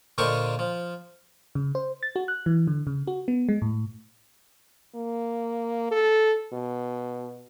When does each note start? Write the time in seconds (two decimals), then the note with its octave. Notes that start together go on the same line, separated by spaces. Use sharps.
0.18 A#2 D3 A#4 C5 D#5 C#6
0.59 F3
1.55 C#3
1.75 C5
2.03 A6
2.16 F#4
2.28 F#6
2.46 E3
2.67 D3
2.87 C#3
3.07 F#4
3.28 B3
3.49 G#3
3.62 A2
4.95 A#3
5.91 A4
6.53 B2